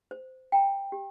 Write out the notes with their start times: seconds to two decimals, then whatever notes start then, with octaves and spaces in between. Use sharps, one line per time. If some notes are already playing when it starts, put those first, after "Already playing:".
0.11 C5
0.52 G5 A#5
0.92 G4